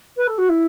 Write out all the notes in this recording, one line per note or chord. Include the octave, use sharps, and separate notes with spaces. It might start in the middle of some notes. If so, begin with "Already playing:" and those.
B4
A4
F#4
E4